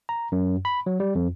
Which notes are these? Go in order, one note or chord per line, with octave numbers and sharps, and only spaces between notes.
A#5
F#2
B5
F#3
G3
F2